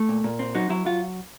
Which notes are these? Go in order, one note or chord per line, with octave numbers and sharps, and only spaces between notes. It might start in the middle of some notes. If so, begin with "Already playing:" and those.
Already playing: A3
A#2
A#2
C4
F#3 D#4
F#3 E4
F#3 F4